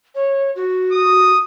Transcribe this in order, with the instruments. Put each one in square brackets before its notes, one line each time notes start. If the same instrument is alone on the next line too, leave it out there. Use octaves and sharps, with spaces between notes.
[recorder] C#5
F#4
[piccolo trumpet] D#6